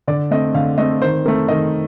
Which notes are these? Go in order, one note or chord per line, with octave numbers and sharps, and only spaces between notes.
D3 D5
A3 C4 D#5
D3 F5
A3 C4 D#5
D#3 C5
A3 C4 A#4
D#3 D#5